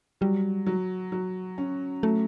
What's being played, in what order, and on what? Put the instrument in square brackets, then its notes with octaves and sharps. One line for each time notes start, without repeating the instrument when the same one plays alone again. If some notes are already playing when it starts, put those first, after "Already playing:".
[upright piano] F#3 [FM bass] G3
[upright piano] F#3
F#3
C#4
[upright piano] F#3 [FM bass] A3